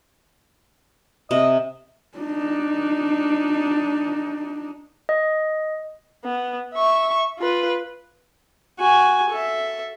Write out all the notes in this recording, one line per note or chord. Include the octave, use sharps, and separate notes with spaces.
C3 D#5
D4 D#4
D#5
B3
E5 C#6
F4 B4
F#4 G#5
A4 E5